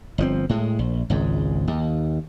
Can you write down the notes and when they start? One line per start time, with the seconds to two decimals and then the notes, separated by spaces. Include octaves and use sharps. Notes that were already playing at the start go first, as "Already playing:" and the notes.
0.18 G1 F3 C4
0.49 A2 G#3
0.79 A#1
1.10 G#1 C#2 G#2
1.68 D#2